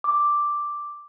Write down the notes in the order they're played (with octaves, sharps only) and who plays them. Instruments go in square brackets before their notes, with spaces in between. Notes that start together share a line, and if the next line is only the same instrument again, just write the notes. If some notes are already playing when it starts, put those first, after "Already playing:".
[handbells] D6